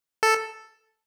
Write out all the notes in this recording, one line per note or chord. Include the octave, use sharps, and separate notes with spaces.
A4